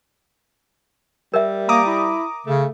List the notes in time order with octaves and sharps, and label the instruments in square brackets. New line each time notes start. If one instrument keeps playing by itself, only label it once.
[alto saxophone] G3 [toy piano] A#4 E5
[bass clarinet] A#3 [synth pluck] A#5 D6 D#6
[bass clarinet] E4
[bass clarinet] C#3 [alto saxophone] A3